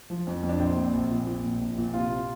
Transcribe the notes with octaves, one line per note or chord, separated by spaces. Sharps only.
F3
F2
F2
D4
A#1 C4
A#2
A#1
A#2
A#2
A#1
A#1
A#2
C3 F4